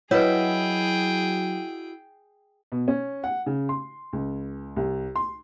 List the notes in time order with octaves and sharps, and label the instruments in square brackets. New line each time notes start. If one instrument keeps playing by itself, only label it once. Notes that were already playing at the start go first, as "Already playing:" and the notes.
[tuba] F#3 [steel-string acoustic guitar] E4 F#4 D#5 [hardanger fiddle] G#4 G5 [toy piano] B4 C#5
[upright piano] B2
C#4
F#5
C#3
C6
C#2
C2
C6